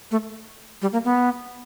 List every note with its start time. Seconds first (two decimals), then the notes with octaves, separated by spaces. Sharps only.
0.11 A3
0.82 G3
0.92 A#3
1.04 B3